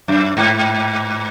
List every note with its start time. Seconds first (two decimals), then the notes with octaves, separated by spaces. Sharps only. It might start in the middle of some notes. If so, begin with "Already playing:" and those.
0.08 F#2
0.37 G#2